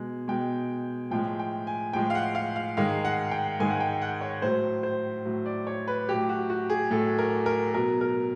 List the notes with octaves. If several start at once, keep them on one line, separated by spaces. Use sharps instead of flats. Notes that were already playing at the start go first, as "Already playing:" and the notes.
Already playing: B2 G#3
B2 G#3 G5
A2 F3 G#3 G5
G5
G#5
A2 F3 G#3 G5
F5
F#5
F5
F5
G#2 D#3 G#3 F5
F#5
G5
G#2 D#3 G#3 G#5
F#5
G5
F#5
C#5
A2 F#3 C5
C5
A2 F#3
D5
C#5
B4
A2 F#3 G4
F#4
F#4
G#4
A2 F#3 A4
A#4
A#4
B2 F#3 A#4
A#4